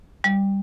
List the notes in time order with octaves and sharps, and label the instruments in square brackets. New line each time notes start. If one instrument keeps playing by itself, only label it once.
[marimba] G3